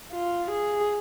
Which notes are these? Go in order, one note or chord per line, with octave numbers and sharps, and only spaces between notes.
F4
G#4